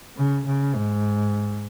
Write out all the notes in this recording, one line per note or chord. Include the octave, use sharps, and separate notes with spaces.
C#3
C#3
G#2